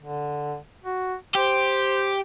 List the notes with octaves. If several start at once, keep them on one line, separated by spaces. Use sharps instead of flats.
D3
F#4
G4 C5